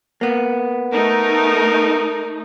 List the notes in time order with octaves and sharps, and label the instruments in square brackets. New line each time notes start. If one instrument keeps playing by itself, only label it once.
[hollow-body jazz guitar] A#3 B3
[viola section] A3 D#4 [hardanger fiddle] A#4